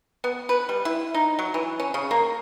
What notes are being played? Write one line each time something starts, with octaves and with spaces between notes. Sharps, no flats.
B3
B4
G3
E4
D#4
F#3
E3
C#4
C#3
A#3